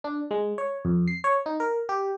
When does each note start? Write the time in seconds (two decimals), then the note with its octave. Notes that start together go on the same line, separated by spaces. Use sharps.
0.04 D4
0.31 G#3
0.58 C#5
0.85 F2
1.08 C7
1.24 C#5
1.46 D#4
1.60 A#4
1.89 G4